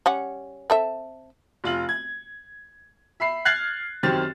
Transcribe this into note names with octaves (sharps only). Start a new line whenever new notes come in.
G3 C#4 F#5
C4 A4 E5
F1 F4 F#7
G#6
E5 B5 C7
F6 F#6 G#6 A6 C7 F#7
F#2 D#3 C4 G4 F6 A6